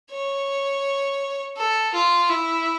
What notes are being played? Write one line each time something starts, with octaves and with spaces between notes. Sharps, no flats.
C#5
A4
F4
E4